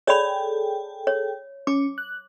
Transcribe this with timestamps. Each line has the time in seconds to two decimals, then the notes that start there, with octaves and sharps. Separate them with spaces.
0.07 G#4 A4 C#5 D5 G5 B5
1.07 C#5
1.67 C#4 D6
1.98 F#6